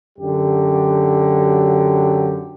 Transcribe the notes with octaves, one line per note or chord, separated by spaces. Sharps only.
F#2 D3 F#3 G4